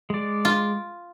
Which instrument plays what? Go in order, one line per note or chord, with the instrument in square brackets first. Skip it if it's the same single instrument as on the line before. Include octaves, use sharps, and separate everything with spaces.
[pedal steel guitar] G#3 D5
[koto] F4